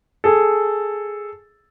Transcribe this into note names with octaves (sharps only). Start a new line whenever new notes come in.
G#4 A4